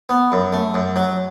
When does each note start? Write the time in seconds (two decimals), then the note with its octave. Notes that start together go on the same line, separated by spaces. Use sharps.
0.09 B3
0.32 F#2
0.52 A3
0.74 F#2
0.96 F#3